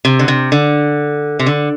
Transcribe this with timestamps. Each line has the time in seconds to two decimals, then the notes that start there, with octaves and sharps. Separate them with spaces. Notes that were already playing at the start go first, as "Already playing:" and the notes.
0.05 C3
0.19 D3
0.28 C3
0.52 D3
1.39 C3
1.46 D3